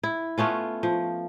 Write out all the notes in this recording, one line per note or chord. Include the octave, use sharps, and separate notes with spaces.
E4
A3 B3 C#4 F4
F3